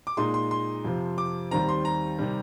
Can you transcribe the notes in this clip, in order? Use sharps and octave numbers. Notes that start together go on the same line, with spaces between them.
D6
A#2 G#3 D#4 C6
C6
C6
F2 C3 F3
D6
D#2 D#3 G3 C4 A#5
C6
A#5
C3 D#3 G3